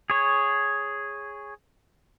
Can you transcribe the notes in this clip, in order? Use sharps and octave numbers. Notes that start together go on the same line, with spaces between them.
G#4 C#5